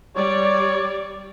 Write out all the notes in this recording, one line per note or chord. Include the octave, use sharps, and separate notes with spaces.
G3 C#5 D5